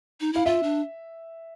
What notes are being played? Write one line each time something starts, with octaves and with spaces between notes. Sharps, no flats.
D#4
E4 F5
F4 E5
D4